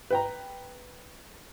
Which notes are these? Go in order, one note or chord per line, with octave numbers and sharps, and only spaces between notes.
B4 G5 A#5